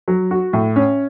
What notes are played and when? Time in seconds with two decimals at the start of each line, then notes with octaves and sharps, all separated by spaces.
0.08 F#3
0.31 F#4
0.53 A2
0.76 C#4